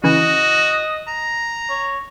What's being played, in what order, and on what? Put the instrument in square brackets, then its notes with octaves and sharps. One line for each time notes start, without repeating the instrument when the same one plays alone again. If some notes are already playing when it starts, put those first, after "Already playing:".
[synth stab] C#3 E3 [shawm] F#4 [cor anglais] D#5
[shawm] A#5
[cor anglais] C#5